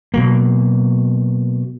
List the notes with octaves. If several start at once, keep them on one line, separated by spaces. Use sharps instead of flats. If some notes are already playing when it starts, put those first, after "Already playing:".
B2 F#3 A#3